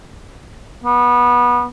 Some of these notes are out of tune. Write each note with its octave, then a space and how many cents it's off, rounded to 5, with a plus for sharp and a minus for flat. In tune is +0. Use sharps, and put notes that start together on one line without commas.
B3 -20